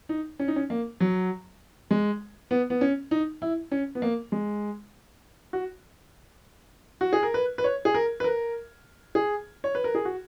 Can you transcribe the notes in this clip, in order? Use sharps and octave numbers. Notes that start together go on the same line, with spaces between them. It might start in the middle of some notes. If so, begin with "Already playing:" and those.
D#4
C#4
D#4
C#4
A#3
F#3
G#3
B3
B3
C#4
D#4
E4
C#4
B3
A#3
G#3
F#4
F#4
G#4
A#4
B4
B4
C#5
G#4
A#4
B4
A#4
G#4
C#5
B4
A#4
G#4
F#4